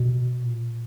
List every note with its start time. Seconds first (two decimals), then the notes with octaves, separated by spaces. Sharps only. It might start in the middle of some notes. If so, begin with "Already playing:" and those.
Already playing: B2
0.44 A#2